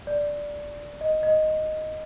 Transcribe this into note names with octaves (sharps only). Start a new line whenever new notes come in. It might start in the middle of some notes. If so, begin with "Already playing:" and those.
D5
D#5
D#5